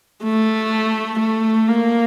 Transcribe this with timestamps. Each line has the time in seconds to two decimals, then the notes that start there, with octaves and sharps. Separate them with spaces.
0.23 A3
1.19 A3
1.68 A#3